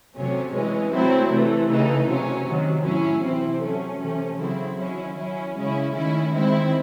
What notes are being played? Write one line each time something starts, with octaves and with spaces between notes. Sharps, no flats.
C3 F#3 A3 C#4
E3 G#3 C#4
F#3 A3 C4 E4
C3 E3 A3
C#3 E3 A3 D#4
C3 F#3 C#4
C3 D#3 F#3
A2 F#3 C#4 E4
C3 E3 C4 E4
F#3 A3 C#4
C3 E3 A3 C#4
C#3 F#3 C4 E4
D#3 F#3 C#4 E4
F#3 C#4 E4
C#3 G#3 C#4 E4
D#3 A3 C#4 E4
D#3 G#3 C4 E4